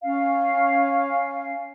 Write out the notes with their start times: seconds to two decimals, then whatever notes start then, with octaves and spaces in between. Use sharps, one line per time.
0.03 C#4 F5